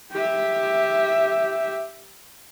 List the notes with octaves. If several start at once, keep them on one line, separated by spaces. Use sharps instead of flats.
G4 E5